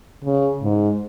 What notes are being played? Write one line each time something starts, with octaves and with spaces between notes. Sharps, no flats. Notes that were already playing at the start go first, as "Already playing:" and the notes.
C#3
G#2